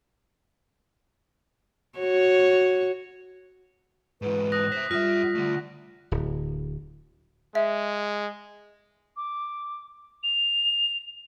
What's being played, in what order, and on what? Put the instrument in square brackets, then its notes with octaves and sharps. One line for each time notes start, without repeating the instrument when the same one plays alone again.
[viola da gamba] F#4 C#5
[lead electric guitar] G#2 E3 [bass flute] B4
[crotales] D#6 F#6 A#6
[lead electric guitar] C5 E5 [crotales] B6
[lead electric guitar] F#2 E5 [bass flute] G3 [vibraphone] F4 [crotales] D#6 A#6
[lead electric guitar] D3 A3
[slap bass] D1
[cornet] G#3 [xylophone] E5
[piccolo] D6
F7